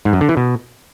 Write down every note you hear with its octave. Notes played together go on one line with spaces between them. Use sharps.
G#2
F#2
D3
E3
B2